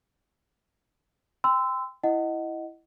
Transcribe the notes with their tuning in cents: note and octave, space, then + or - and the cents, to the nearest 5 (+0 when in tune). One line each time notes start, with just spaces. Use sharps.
G5 +20 C6 -30 E6 +0
E4 +0 D#5 +0 F#5 +10